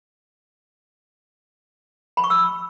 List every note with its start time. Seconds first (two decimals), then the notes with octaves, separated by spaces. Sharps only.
2.17 B5
2.24 C#6
2.30 E6